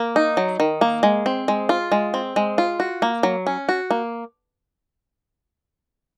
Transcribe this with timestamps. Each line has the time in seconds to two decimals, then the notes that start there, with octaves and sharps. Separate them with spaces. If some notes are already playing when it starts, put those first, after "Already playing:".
Already playing: A#3
0.16 D#4
0.37 F#3
0.60 D#3
0.81 A#3
1.03 G#3
1.26 C4
1.48 G#3
1.69 F4
1.92 G#3
2.14 C4
2.36 G#3
2.58 F4
2.80 F#4
3.02 A#3
3.23 F#3
3.47 C#4
3.69 F#4
3.91 A#3